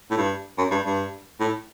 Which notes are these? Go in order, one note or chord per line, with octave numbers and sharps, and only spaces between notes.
A2
G2
F#2
G2
G2
A2